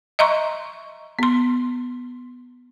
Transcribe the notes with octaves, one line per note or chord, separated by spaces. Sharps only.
D#5 E5 A#5 C6 C#6
B3 C6